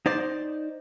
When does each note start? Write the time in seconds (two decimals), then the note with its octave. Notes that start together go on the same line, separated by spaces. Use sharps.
0.06 D#4 C5 D5